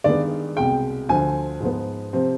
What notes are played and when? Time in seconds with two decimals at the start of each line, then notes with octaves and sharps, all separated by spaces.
0.04 G2 D#3 G#3 B3 D5
0.56 C2 B2 G#3 G5
1.09 D2 D3 F3 G#5
1.61 G#2 F3 B3
2.13 C3 F3 C4